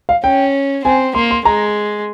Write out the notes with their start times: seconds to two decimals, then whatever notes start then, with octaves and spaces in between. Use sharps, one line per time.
0.09 F5
0.24 C#4 G5
0.85 C4 G#5
1.15 A#3 C6
1.31 C6
1.45 G#3 A#5